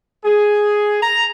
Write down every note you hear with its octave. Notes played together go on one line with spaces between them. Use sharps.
G#4
A#5